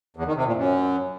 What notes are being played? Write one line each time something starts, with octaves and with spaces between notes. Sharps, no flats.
E2
D#3
C3
A#2
F#2